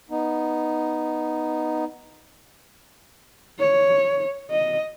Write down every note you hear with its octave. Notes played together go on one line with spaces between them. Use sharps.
B3 D#4
C#5
D#5